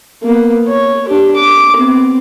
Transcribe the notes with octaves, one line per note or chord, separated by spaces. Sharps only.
A#3 B3
C#5
D4 G4
D6
B3 C4